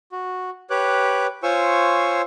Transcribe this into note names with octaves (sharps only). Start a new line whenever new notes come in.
F#4
G4 B4 C#5 D6 F#6
F4 C5 C#5 G#5 C#6 E6